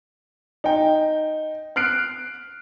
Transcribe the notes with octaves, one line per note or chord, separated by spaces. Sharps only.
D#4 G5
F6 F#6 C7 D7